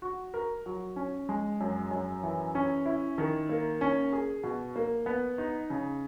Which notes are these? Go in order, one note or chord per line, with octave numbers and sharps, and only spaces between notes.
F#4
A#4
F#3
C#4
G#3
F#2
F#2
E3
C#4
E4
D#3
A#3
C#4
G#4
B2
A#3
B3
D#4
C#3